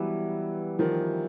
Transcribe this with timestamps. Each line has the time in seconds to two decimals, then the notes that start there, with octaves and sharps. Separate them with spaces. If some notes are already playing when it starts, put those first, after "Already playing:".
Already playing: E3 F#3 G3 B3
0.79 D#3 F3